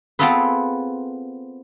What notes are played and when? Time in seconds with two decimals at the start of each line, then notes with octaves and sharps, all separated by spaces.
0.19 B3 C4 F4 G#4 A4 B4